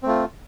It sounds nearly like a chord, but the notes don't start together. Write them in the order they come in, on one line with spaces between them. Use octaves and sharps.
C4 A3 F4